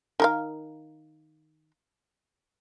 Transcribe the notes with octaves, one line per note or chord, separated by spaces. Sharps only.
D#3 A#4 F5